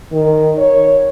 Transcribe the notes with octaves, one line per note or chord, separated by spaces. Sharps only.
D#3
C#5